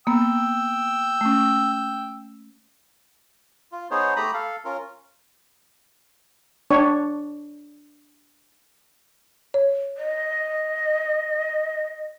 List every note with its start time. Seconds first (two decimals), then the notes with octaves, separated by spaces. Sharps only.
0.07 A#3 B3 G5 E6
1.21 A3 C#4
3.72 F4
3.91 B3 D#4 G#4 C5 C#5
4.16 A3 G4 A#5 B5 D#6
4.34 A4 F5
4.65 C#4 F4 A#4
6.71 D4 C#5
9.54 C#5
9.97 D#5